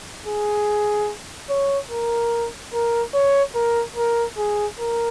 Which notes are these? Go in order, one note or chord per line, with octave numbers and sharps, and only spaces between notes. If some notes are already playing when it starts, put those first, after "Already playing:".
G#4
C#5
A#4
A#4
C#5
A#4
A#4
G#4
A#4